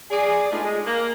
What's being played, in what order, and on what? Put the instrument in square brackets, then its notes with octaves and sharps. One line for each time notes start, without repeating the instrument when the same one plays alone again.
[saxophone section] G#4 D5
G#3 A3 B3 D4 D#4 F4
G#3
A#3 A#4